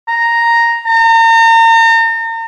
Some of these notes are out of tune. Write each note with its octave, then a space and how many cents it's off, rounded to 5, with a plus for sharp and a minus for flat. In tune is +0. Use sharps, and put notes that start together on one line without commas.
A#5 +0
A#5 -40